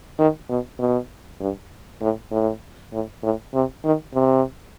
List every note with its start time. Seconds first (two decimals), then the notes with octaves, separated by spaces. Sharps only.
0.19 D#3
0.49 B2
0.79 B2
1.40 G2
2.02 A2
2.31 A2
2.93 A2
3.23 A2
3.54 C3
3.84 D#3
4.14 C3